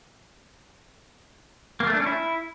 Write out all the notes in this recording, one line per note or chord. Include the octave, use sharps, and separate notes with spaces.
A#3
A3
D4
C#4
E4